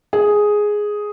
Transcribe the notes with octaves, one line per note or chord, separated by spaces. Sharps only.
G#4